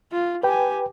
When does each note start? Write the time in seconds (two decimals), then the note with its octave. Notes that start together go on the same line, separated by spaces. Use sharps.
0.12 F4
0.43 G4 B4 G5 G#5